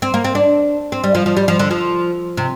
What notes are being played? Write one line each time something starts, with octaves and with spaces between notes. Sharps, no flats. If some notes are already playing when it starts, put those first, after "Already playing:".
C4
A#3
C4
D4
C4
G3
F3
F3
G3
F3
D3
F3
C3